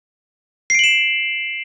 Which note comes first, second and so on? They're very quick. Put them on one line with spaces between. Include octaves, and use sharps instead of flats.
C7 D7 F#7 E7